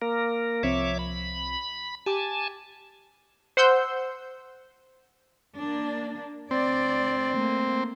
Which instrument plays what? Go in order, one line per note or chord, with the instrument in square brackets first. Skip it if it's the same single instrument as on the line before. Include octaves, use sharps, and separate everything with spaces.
[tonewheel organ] A#3 A#4
[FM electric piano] C2 F3 C4 [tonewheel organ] C#5 E5 D6
[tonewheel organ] B5
[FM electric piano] G4 D6 [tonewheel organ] G#5 A5
[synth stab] C5 F#5 C6 E6 G6
[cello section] A#3 D4
[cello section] D2 D5 [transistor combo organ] C4
[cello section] A3 A#3